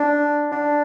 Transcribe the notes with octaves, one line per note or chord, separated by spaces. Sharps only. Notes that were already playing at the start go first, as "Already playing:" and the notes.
Already playing: D4
D4